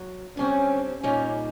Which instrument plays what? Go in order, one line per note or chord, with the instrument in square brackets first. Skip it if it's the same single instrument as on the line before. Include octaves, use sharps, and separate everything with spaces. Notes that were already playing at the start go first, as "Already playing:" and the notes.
Already playing: [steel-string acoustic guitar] F#3
[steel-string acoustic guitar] D3 G3 C4 [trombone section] C#4
[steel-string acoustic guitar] A#2 G3 A#3 D#4 [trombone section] C#4